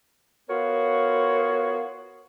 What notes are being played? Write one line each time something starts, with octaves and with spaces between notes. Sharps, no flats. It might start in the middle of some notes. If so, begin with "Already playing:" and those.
B3 F4 F#4 A#4 C#5